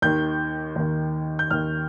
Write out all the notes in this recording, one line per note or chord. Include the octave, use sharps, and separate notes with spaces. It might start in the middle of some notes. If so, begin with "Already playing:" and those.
D#2 D#3 G6
D#2 D#3
G6
D#2 D#3 F6